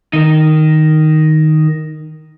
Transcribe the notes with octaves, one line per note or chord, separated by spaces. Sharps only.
D#3 D#4 A#4